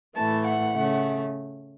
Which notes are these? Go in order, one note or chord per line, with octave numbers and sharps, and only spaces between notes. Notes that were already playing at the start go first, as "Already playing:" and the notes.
A2 E3 A3 A5
F#5
C#3 A3